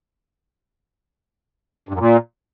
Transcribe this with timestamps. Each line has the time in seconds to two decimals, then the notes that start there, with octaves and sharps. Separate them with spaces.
1.89 G2
1.94 F#2
2.00 A#2